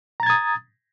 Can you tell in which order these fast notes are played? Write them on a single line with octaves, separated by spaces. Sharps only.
A#5 A6 G#6 D#6